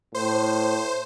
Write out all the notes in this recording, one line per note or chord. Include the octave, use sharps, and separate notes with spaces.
A2 C5